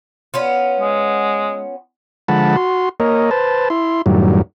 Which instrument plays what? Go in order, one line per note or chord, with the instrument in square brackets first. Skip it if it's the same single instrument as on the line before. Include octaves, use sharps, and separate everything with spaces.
[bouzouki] B3 C#4 F4
[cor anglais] G#3
[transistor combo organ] D3 F3 G#3 F#5 A5 B5
F#4 C6
A#3 A#4 C#5 D#5
B4 C5 A5
E4 C6
F#2 A2 D#3 F#3 G3